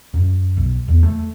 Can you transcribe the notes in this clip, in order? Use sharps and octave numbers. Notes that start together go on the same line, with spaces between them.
F#2
B1
E2
A3